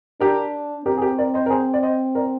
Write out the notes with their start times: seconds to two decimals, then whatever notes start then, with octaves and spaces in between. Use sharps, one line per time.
0.20 D4 G4 A#4
0.86 C4 G4 A#4
0.97 G#4
1.01 G4 A#4
1.18 A#4 D5
1.34 C5 D#5
1.46 A#4
1.50 G#4 C5
1.74 D5
1.83 C5 D#5
2.15 A#4 D5